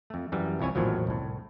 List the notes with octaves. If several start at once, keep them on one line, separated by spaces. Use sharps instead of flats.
F2 A3
F#2 E3 G3
C2 F2 E4 C#5 G#5
A#1 E2 A2 D#3 F3 F#3
C2 A2